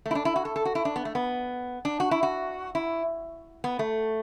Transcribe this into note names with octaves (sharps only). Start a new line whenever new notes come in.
A3
E4
D4
E4
F#4
A4
A4
F#4
E4
D4
B3
A3
B3
D4
F#4
E4
F#4
E4
B3
A3